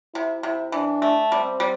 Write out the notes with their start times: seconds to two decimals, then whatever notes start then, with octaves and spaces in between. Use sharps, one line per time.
0.14 C3 E4
0.43 C3 E4
0.72 E3 D4
1.02 A3
1.32 G3 C4
1.60 G3